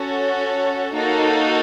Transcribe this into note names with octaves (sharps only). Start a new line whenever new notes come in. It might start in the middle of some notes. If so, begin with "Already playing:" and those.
Already playing: C#4 F#4 A4 C#5
A#3 D#4 F#4 A4